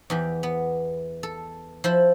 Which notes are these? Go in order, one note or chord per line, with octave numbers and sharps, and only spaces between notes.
E2 E3 G4
B3
A4
F3 E4 C5